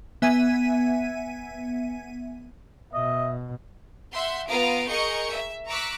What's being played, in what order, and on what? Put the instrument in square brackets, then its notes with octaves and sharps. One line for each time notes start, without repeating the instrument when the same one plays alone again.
[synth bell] B3 E5 G#5 G#6 D#7
[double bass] B2 [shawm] D#5 [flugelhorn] E5
[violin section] E5 F#5 C6 G6
B3 F4 F5 A#5 D#6 D7
G#4 A#4 D#5 C#6 G6 C#7
E5
A#5 C#6 D6 E6 F#6 B6